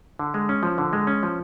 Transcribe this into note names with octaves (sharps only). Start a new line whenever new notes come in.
D3
G#3
C#4
F3
D3
G#3
C#4
F3